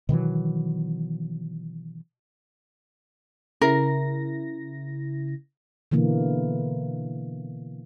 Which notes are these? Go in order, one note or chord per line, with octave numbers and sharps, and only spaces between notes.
B2 D#3 E3 F#3
C#3 E4 A#4 A#6
B2 D3 E3 A#3